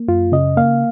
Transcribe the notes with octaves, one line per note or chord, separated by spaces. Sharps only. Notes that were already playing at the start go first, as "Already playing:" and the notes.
Already playing: A#3
F#2 F4
C#3 D#5
A#3 F5